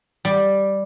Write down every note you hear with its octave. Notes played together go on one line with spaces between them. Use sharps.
G3